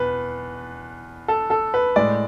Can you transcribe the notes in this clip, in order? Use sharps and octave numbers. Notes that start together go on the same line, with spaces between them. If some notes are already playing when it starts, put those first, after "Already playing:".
Already playing: E2 B2 B4
A4
A4
B4
A2 G#3 D5